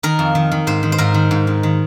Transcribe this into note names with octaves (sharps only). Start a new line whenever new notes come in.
D#3 A#4
F2
D#3
D#3
G#2 C5
D#3
C5
G#2 A#4
D#3
G#2
D#3
D#3